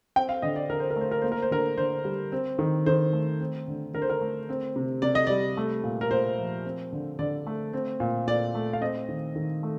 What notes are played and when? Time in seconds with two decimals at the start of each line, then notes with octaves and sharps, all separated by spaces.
0.16 C4 G5
0.29 F5
0.42 D3 D#5
0.56 D5
0.70 D3 A#4
0.80 C5
0.91 A#4
0.96 A3 C5
1.11 A#4
1.22 A#3 C5
1.32 A#4
1.42 C5
1.51 D3 A#4
1.77 D3 C5
2.05 G3
2.32 C4
2.59 D#3
2.86 D#3 C5
3.13 A3
3.41 C4
3.68 D3
3.94 D3 A#4
4.02 C5
4.10 A#4
4.21 A3
4.49 C4
4.76 C3
5.02 C3 D5
5.15 D#5
5.27 G3 D5
5.57 A3
5.84 A#2
6.01 A#4
6.11 A#2 C5
6.38 F3
6.65 C4
6.93 D3
7.19 D3 D5
7.47 A3
7.73 C4
8.00 A#2
8.27 A#2 D5
8.55 A3
8.73 F5
8.82 C4 D#5
9.09 D#3
9.36 D#3
9.63 A3